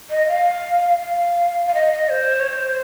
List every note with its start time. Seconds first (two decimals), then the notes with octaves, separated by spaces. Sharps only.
0.10 D#5
0.28 F5
1.01 F5
1.66 F5
1.74 D#5
1.92 D#5
2.10 C5
2.40 C#5
2.47 C5